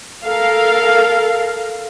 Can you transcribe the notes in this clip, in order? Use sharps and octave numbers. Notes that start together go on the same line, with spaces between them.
A4 A#4 F5